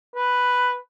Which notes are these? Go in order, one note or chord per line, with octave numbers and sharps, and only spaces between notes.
B4